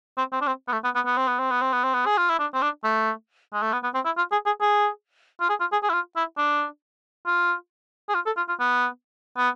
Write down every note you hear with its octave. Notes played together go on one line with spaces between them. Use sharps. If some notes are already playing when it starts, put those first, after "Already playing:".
C4
C4
D4
C4
B3
A3
B3
B3
B3
C4
B3
C4
B3
C4
B3
C4
B3
G#4
F4
E4
D4
C4
D4
A3
G#3
A3
B3
B3
C4
E4
F4
G#4
G#4
G#4
F4
G#4
F4
G#4
G#4
E4
F4
E4
D4
F4
G#4
F4
A4
F4
F4
B3
B3